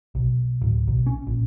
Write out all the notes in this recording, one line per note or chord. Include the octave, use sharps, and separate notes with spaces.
B1
D1
B1
C#4
A#1